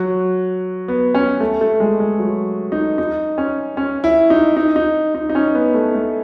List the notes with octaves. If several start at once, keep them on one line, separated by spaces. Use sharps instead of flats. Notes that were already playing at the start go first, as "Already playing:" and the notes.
Already playing: F#3
B3
C#4
A3
A3
G#3
G#3
F#3
D#4
D#4
C#4
C#4
E4
D#4
D#4
D#4
D#4
D#4
C#4
B3
A3
A3